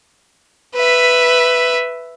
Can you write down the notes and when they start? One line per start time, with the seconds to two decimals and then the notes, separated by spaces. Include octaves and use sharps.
0.75 B4 E5